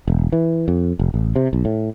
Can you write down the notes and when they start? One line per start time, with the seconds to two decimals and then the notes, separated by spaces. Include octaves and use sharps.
0.08 E1
0.32 E3
0.68 F2
0.99 F1
1.14 A1
1.36 C3
1.53 B1
1.65 A2